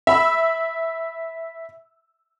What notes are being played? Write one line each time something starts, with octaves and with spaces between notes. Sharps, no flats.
E5 B5 E6